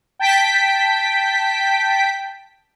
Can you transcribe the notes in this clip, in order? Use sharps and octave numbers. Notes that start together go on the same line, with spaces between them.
G5 A5 G6 B6 D7